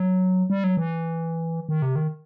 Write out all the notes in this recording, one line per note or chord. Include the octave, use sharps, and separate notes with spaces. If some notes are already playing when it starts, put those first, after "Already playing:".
Already playing: F#3
G3
F#3
E3
D#3
C3
D#3